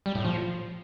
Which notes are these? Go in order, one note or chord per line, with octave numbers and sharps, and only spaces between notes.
G3
A2
F3